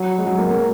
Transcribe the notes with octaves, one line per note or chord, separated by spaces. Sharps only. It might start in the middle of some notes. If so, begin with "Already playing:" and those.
Already playing: F#3
G#3
F#3
A#3
A#3